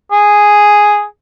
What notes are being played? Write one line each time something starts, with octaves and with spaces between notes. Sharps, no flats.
G#4